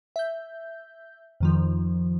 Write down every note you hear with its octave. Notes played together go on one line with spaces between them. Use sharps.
E5 G6
F2 D#3 F3